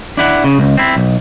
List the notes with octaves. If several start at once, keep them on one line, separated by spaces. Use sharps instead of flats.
D4 E4 F#5
C#3
C#2
C4 E4
B1